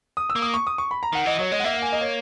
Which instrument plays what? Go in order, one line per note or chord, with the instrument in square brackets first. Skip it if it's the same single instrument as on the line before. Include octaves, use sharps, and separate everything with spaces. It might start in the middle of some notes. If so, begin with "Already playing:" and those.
[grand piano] D#6
E6
[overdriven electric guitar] A#3
[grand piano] D#6
C#6
D#6
C#6
B5
A#5
[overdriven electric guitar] D#3 [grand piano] F#5
[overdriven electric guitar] E3 [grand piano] D#5
[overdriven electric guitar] F#3 [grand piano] C#5
[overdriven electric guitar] G#3 [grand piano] D#5
[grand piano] F#5
[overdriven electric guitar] A#3 [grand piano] E5
[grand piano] F#5
G#5
D#5
C#5